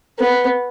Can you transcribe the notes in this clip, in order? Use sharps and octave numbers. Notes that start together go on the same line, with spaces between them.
B3